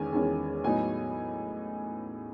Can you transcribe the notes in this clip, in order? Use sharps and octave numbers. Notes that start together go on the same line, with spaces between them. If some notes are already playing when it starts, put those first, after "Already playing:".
Already playing: E2 D#3 G#3 C#4 G#5
E2 D#3 G#3 C#4
A2 F#3 B3 D#4 G#5